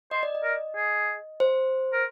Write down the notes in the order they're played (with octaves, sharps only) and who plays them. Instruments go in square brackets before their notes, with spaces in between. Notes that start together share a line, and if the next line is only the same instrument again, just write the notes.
[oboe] C5 [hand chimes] D#5
[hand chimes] D5
D#5
[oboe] A#4
G#4
[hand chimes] C5
[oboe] A#4